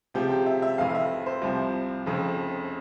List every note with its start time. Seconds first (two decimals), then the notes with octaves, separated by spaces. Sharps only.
0.14 C#2 C3 F3 G4
0.30 G4
0.46 E5
0.62 E5
0.78 F1 F2 E3 F5
0.89 F5
0.95 E5
1.26 C5
1.42 C2 C3 F3
2.06 F1 F2 C#3